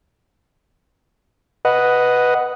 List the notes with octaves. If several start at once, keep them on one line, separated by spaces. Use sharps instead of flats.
B4 D#5 F#5